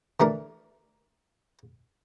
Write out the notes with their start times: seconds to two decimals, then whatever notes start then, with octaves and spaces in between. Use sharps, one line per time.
0.20 E3 A3 D4 A#4